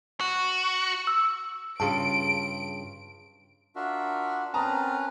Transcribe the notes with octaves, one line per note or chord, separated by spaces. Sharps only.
F#4
E6
G2 C#3 F4 G#4 A5 D7
D4 F4 F#4 A#4 E5
C4 C#4 A#4 B4 A5 A#5 D#6